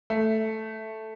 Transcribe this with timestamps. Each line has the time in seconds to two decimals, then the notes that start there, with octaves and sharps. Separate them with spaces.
0.10 A3